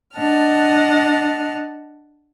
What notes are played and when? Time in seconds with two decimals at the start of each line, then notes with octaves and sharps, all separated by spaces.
0.15 D4 D#5 F#5 A5 F6